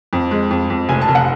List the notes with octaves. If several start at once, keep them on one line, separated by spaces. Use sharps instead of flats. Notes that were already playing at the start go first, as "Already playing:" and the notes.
F2
G#3
F2
F2
F1 G#5
A5
F1
F#5